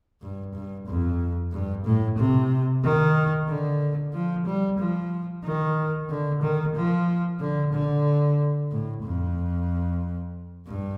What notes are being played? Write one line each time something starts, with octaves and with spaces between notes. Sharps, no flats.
G2
G2
F2
G2
A2
C3
D#3
D3
F3
G3
F3
D#3
D3
D#3
F3
D3
D3
A2
F2
G2